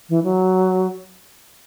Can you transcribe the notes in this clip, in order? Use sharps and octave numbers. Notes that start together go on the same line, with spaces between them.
E3
F#3